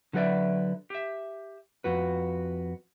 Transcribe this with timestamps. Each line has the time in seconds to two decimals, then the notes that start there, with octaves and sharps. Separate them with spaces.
0.13 D3 F#3 F#4 B4 D5 E5
0.90 G4 E5
1.84 F2 F#4 B4